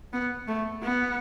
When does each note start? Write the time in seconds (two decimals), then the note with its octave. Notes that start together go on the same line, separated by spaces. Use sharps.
0.13 B3
0.48 A3
0.83 B3